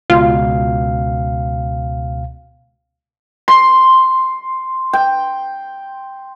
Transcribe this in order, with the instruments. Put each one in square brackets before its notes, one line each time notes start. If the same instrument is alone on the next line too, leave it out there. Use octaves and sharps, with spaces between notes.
[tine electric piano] C#2 B2 F5 [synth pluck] F4
[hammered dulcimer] C6
G5